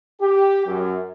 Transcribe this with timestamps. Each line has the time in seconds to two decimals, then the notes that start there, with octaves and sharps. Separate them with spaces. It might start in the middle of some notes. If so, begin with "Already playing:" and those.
0.21 G4
0.67 F#2